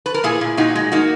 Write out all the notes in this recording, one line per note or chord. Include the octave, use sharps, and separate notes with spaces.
B4
A#4
A#2 E4 G#4
A#2
A#2 D#4 F#4
G#3
A#3 D#4 F#4